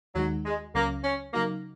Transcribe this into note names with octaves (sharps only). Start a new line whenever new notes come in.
D#2 D#3 F#3 G#3 D#4 F#4
G#3
C#2 C#3 F#3 A#3 C#4
C#4
C#3 F#3 A#3 D#4 F#4